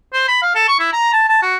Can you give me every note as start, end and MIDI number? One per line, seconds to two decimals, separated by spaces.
0.13 0.24 72
0.28 0.40 83
0.42 0.53 77
0.55 0.63 69
0.68 0.78 85
0.80 0.88 64
0.93 1.10 82
1.13 1.25 81
1.29 1.40 81
1.42 1.56 66